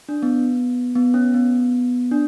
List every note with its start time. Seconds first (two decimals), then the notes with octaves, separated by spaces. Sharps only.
0.09 D4
0.23 B3
0.95 B3
1.14 C#4
1.34 B3
2.11 D4